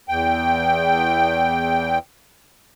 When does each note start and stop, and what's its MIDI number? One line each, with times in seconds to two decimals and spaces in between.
0.09 1.99 40
0.09 1.99 79